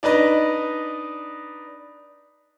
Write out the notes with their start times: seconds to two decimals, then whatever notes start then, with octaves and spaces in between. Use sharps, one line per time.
0.03 D4 D#4 B4 D#5